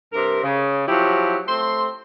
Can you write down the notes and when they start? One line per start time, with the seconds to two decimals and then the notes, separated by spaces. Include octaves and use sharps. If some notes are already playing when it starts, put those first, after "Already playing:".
0.12 G2 C3 A#4
0.43 C#3
0.88 F3 F#3 E4 G4
1.47 A3 C4 C6